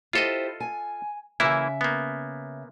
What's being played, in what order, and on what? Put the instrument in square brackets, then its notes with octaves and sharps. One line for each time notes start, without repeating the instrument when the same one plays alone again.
[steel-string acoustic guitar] E4 G4 C5 [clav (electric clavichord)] F4 A4 D#5
[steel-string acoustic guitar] G#5
[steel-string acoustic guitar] C#3 E5 [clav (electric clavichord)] E3 A#3 E4
[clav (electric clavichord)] A#3 B3